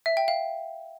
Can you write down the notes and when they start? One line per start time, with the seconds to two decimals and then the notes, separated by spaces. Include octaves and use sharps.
0.06 E5
0.17 G5
0.28 F5